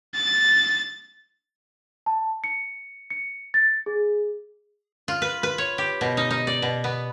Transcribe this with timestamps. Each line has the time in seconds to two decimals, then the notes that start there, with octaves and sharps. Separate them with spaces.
0.15 A6
2.06 A5
2.44 C#7
3.10 C#7
3.54 A6
3.86 G#4
5.08 F4
5.22 B4
5.43 B4
5.58 C#5
5.78 G4
6.01 B2
6.17 D#4
6.30 D#4
6.47 D5
6.62 B2
6.84 B3